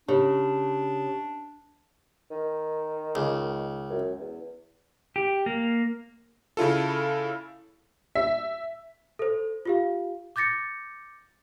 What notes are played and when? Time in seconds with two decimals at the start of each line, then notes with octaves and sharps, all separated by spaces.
0.08 C#3 D4 G4
2.31 D#3
3.15 C#2
3.90 F#2
4.19 E2
5.16 G4
5.46 A#3
6.57 C#3 E4 F4 A4
8.15 E5
9.19 A4 C5
9.65 F4 G4 F5
10.36 D6 G6 A6 A#6 C#7